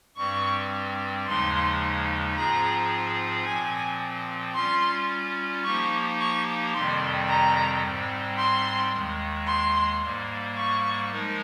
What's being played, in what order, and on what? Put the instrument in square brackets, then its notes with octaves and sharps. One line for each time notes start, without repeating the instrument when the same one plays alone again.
[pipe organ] G2 G3 C4 [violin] C#6
[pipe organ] D#2 C#3 F3 G#3 D#4 [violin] C6
[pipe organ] G#2 F3 C4 F4 G#4 [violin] A#5
[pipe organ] A#2 F3 C4 [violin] G#5
[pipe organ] G3 C#4 F4 [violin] C6
[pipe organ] F3 A#3 D#4 G4 [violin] C#6
[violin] C#6
[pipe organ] F2 C3 D#3 G3 C4 [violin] C6
[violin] A#5
[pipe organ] G#2 G3 C4
[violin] C6
[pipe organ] D#2 D#3 G#3
[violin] C6
[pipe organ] G#2 G3 A#3
[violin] C#6
[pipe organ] F3 G#3 D#4 A#4